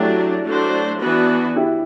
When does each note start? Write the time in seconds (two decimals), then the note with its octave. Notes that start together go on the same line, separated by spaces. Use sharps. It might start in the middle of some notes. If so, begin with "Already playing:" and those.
Already playing: F#3 A3 D4 E4 G4
0.45 F#3 A3 D4 F#4 C5
1.01 E3 B3 D4 F#4 B4
1.56 E4 G4